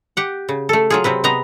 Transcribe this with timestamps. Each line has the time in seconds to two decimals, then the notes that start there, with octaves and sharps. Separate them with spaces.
0.17 G4 F#5
0.49 C#3
0.69 A3 A4
0.90 F#3 F4 G#4
1.04 C3 F#3 C4 B4
1.24 C3 B3 D#5 A#5